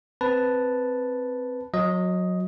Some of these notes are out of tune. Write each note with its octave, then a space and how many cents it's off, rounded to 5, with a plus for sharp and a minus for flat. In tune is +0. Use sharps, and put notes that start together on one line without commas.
C4 +0 B4 +0 A5 +0
F#3 -25 D#5 +5